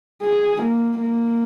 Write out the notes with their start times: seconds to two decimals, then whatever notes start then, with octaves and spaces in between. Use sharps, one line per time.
0.22 G#4
0.62 A#3
1.01 A#3